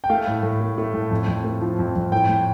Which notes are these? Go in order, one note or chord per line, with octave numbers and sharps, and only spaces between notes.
G5
A3 F5
A2
A2
A3
A3
A2
F2
F2
A3
F3
F2
F2
A2 G5
A2